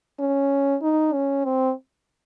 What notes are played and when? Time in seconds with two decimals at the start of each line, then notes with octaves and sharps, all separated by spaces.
0.19 C#4
0.82 D#4
1.14 C#4
1.45 C4